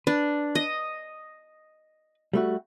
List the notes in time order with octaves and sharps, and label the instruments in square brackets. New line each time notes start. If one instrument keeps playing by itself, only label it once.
[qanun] D4 [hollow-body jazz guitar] B4
[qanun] D#5
[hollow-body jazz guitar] G3 A3 F#4